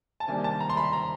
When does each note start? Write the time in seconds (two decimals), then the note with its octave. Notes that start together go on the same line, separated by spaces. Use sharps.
0.20 A5
0.28 C3 D#3 G3 A#3 D4 G#5
0.44 A5
0.60 A#5
0.70 C6
0.77 B5
0.93 A#5